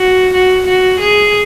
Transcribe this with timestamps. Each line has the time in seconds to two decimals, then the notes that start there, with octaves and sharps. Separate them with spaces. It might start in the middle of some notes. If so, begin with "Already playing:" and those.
Already playing: F#4
0.33 F#4
0.67 F#4
0.99 G#4